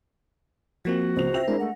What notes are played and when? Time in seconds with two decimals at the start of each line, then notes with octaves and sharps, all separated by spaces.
0.85 F3 A#3 C4 F#4
1.16 C#2 C5 F7
1.34 E5 G5 A#6 F7
1.48 G#3 D4 E4 A#4
1.60 A3 F#5